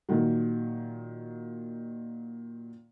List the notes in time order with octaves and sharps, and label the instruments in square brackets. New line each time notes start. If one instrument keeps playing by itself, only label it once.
[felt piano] A#2 D#3 F#3